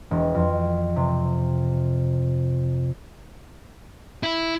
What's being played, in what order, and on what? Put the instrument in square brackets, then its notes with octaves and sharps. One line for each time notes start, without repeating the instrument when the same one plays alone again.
[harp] E1
F2
C3
[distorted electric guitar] E4